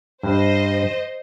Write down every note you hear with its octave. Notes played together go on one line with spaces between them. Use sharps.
G2 C5 D#5